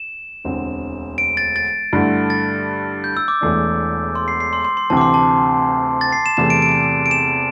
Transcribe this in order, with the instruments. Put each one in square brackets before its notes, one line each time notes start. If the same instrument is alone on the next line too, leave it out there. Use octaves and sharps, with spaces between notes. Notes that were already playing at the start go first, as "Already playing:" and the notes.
Already playing: [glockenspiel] E7
[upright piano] E1 D2 D3 C4
[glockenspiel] D7
A6
A6
[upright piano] G2 D3 A3 E4
[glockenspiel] A6
G6
E6
D6
[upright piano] E1 E2 E3 A3 D4
[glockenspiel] C6
C7
C7
C6
C6
C6
[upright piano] D2 C3 E3 C4 [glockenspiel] A5
[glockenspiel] D6
C6
A5
A6
C7
E7
[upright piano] E2 C3 E3 A3 [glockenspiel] E7
[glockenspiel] D7
D7
D7
E7